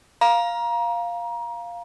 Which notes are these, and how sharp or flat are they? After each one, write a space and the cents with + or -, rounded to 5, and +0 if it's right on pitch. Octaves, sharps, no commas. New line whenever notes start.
F5 +0 A#5 +25